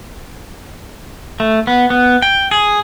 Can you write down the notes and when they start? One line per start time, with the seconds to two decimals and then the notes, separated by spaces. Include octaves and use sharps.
1.40 A3
1.67 B3
1.90 B3
2.22 G5
2.51 G#4